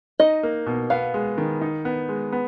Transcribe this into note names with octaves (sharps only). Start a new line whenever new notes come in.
D#4 D#5
A#3
B2
B3 F5
G#3
D#3
D#4
B3
G#3
B3